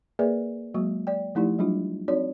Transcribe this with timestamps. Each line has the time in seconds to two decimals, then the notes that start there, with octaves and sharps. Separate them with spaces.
0.19 A#3 G#4 A#4 B4 D5 E5
0.74 F#3 G#3 A#3 F#4 C#6
1.07 D5 G5
1.35 F3 A3 D#4 E4 G4
1.59 F#3 G3 D4 F4
2.08 C4 D#4 F#4 C#5 D5